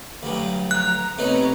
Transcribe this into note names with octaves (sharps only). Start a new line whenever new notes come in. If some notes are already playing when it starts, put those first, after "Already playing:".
D2 G2 F#3
F3 A#5 F#6
C3 A3 B3 D#4 C#5 A#5